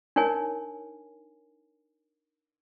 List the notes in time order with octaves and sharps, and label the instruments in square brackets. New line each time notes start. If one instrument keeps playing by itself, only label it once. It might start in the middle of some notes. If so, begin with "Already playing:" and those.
[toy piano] D4 D#4 A#4 C#5 G#5